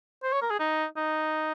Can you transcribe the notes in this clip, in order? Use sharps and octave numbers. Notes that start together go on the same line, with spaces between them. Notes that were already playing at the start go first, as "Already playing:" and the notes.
C5
C#5
A#4
G#4
D#4
D#4